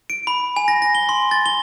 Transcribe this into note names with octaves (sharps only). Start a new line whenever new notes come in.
D7
B5
G#5
A#6
A#6
G7
C6
A6
G7